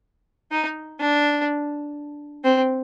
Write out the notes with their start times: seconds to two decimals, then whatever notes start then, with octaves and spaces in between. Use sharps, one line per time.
0.51 D#4
1.00 D4
2.44 C4